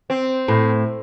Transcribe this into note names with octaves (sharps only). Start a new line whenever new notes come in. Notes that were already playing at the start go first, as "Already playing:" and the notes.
C4
A2